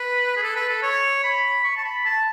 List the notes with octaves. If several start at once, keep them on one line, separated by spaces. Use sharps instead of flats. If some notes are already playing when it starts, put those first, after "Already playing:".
Already playing: B4
G#4
A4
B4
A4
C#5
B5
C#6
A5
B5
A5